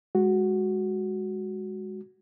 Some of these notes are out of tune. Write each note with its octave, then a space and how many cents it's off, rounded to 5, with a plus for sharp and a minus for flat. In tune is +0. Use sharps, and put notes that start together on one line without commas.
G#3 -15 F#4 +0